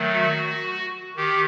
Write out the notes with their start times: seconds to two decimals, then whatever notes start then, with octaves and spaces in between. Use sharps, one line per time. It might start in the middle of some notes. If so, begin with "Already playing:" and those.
Already playing: D#3 F#3 A3
0.13 F#4
1.16 D#3 G4